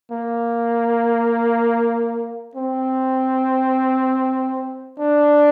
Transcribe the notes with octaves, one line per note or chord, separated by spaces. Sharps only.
A#3
C4
D4